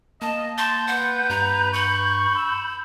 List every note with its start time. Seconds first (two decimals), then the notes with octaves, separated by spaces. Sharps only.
0.22 A#3 D#5 A5
0.58 A5 C6 G6
0.87 B4 F#5
1.30 G2 A#5
1.74 B5 C#6
2.36 E6